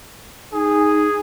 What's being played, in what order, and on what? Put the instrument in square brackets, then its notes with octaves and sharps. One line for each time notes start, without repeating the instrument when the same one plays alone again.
[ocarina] D#4 [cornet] G#4